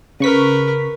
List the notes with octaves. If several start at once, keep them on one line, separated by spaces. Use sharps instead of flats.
C#3 A#4 B4 C#6 B6